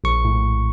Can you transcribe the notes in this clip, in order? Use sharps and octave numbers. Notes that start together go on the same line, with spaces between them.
A#1 C#6
A2